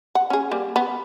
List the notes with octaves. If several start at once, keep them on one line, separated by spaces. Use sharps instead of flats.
F#5
C#4 G#4
G3 A#3
B3